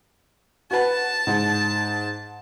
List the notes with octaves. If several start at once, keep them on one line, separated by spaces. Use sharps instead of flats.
F#4 B4 A5
G#2